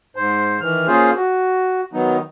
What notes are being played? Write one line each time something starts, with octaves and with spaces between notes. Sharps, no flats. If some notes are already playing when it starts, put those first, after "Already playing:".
G#2 C5
D#3 E3 F6
A#3 C#4 F4 G#4 C5
F#4
D#3 F#3 B3 D#4